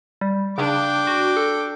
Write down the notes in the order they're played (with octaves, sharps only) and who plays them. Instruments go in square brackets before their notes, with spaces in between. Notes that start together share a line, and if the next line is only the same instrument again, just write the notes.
[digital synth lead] G3
[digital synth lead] C#3 [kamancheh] D4 [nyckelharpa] G5 D6
[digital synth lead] F#4
A4